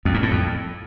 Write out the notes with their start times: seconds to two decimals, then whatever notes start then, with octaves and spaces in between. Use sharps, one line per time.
0.05 F2
0.14 G#2
0.22 A2
0.31 F2